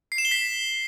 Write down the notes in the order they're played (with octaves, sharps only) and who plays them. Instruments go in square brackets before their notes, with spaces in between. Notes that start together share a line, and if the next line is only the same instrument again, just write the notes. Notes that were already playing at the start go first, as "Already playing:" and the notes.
[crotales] C7
E7
G7
B6